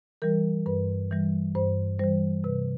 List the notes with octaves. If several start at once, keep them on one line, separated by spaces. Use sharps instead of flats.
E3 G3 A#4
G2 B4
E3 G3
G2 C5
E3 G3 C5
C3 B4